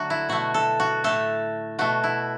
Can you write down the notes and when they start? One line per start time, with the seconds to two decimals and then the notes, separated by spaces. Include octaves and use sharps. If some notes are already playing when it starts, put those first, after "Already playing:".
Already playing: D3 F#3 A3 F#4 A4
0.10 E4
0.29 B2 A3 F#4
0.54 A4
0.80 F#4
1.04 A2 A3 A4
1.79 B2 A3 F#4
2.04 E4